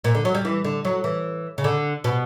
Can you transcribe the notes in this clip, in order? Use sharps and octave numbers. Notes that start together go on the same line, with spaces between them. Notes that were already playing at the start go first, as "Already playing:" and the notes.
A#2
D3
F#3
G3
E3
D3
F#3
E3
C#3
D3
B2